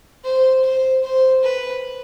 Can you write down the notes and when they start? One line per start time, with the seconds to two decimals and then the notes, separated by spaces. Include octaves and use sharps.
0.24 C5
0.64 C5
1.04 C5
1.44 B4